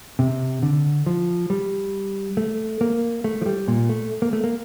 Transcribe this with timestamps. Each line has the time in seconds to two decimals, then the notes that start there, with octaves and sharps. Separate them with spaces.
0.19 C3
0.63 D3
1.06 F3
1.50 G3
2.37 A3
2.81 A#3
3.24 A3
3.41 F3
3.46 G3
3.68 A#2
3.89 A3
4.22 A#3
4.33 A3
4.44 A#3